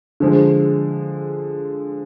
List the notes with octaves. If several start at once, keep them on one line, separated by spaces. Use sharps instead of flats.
D3 F3 G#3